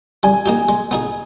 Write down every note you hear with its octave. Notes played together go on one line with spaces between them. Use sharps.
G3 G#5
A#3 D#4 G4
G#3
B3 D#4 G#4